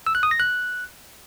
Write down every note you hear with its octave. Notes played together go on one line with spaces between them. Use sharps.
E6
F#6
D#6
A#6
F#6